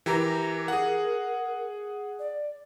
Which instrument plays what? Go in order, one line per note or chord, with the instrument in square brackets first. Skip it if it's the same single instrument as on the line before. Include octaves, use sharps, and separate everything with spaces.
[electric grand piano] E3 G4 A#5 [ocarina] A#4
[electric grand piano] G#4 F#5
[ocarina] D5